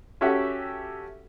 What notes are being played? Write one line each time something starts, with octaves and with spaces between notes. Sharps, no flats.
C#4 F#4 G4 A4 E5 F#5